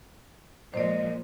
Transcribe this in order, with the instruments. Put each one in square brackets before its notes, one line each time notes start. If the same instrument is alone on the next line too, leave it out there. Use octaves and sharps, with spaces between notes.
[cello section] A#2 F3 G#3 [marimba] C5 D5 [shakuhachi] D#5